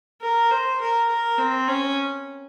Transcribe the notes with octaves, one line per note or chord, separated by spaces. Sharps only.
A#4
C5
A#4
A#4
C4
C#4